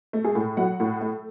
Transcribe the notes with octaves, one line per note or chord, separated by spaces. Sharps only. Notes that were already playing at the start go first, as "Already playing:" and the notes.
A3
G#3 G#4
A2
F#3 F#4 F#5
A2
A3